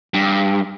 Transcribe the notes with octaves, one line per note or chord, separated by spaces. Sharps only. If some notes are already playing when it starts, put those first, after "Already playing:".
G2